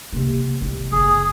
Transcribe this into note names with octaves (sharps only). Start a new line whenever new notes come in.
C3 A#3
C2
F#1 G#4